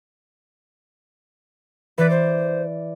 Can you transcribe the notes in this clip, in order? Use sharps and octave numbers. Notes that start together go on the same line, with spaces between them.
E3 B4 D5
C5